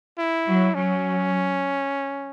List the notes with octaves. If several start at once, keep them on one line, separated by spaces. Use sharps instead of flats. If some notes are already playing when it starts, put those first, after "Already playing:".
E4
F#3
F#3 C#4